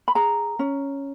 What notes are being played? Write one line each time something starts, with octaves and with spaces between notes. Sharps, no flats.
B5
G#4 A#5
C#4